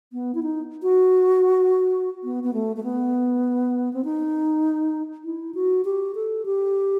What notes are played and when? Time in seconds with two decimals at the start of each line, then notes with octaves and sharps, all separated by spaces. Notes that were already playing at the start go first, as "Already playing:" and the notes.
0.13 B3
0.35 E4
0.43 D#4
0.83 F#4
2.24 B3
2.44 B3
2.54 A3
2.76 A3
2.83 B3
3.93 C4
4.04 D#4
5.24 E4
5.55 F#4
5.85 G4
6.15 A4
6.46 G4